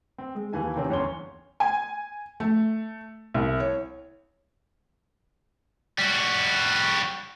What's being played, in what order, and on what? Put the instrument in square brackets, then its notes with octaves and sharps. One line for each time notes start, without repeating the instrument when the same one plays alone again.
[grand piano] C4
G#3
D#2 E3 G#5 A5
C3 D#3 C4 C#4
G1 E2 C#4 C#5 C6 G7
[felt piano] G#5
A3
C2
C#5
[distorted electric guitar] G3 F#4